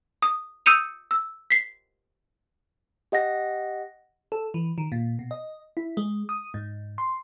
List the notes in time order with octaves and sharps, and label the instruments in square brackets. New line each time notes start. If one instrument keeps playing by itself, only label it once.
[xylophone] D#6
D#6 E6 G6 C#7 D#7 F7
E6
B6 C7
[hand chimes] G4 D#5 F#5 A#6
[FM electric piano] A4
E3
D#3
A#2
B2
D#5
E4
G#3
D#6
G#2
C6